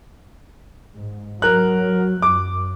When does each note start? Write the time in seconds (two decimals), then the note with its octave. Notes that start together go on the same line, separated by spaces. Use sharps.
0.95 G#2
1.42 F#3 A#4 F#6
2.22 F#2 D6